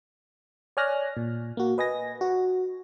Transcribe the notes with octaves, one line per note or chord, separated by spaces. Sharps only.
C#5 D5 G#5 F6 F#6 A#6
A#2
A#3 F#4
B4 D#5 G#5 A#6
F#4